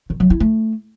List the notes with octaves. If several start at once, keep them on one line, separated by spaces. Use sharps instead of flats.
D#3
F#3
E4
A3